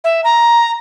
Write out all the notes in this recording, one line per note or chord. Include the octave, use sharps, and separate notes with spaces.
E5
A#5